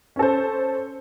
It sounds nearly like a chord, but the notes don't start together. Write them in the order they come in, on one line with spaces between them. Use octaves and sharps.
C#4 A4 C5